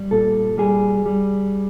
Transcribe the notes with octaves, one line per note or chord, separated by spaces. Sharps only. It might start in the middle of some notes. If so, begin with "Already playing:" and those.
Already playing: G3
A#2 A4
G3 G#4
G3